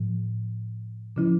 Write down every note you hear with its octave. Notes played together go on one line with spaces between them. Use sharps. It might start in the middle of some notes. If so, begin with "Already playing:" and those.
Already playing: A2 F3
C#3 F3 C#4 E4